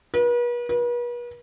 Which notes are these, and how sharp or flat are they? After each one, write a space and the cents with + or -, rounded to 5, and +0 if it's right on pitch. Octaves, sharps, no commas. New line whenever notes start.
B4 -40
B4 -40